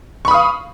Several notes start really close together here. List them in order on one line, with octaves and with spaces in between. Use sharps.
C#6 B5 D#6 F5